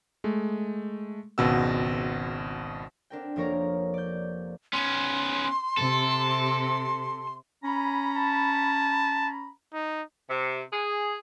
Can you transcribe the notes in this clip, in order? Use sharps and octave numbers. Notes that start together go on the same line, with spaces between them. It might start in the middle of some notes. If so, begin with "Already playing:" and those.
G#3 A3
G#1 C#2 B2 F#5 E6
C4 D4 A#4 G5
F1 F3 A#3 A#4 C#5 A#5
D5 G6
B3 C#4 C6
C3 A4
C#4 A#5 B5
A5
D#4
C3
G#4